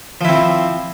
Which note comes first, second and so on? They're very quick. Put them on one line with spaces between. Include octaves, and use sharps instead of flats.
F3 E4 C4